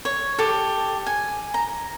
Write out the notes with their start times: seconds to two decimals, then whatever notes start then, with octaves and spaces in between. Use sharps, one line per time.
0.05 C#5
0.39 G4 A4
1.07 G#5
1.54 A#5